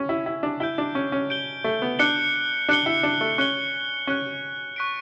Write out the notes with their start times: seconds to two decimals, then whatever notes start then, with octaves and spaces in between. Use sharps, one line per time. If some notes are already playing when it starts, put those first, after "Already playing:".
Already playing: C#4
0.09 E4
0.26 E4
0.43 D4
0.60 E4 G6 D7 G7
0.78 D4
0.95 C#4
1.12 C#4
1.30 G6 D7 G7
1.64 A3
1.82 B3
1.99 D4 F#6 C#7 G7
2.69 D4 F#6 C#7 G7
2.86 E4
3.03 D4
3.21 A3
3.38 C#4 F#6 C#7 G7
4.07 C#4 F#6 C#7 G7
4.76 C#6 F#6 B6 D7